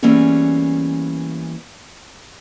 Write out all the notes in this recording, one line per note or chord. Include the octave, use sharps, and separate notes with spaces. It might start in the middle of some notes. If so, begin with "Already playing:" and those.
E3 G3 A#3 B3 C#4 G#4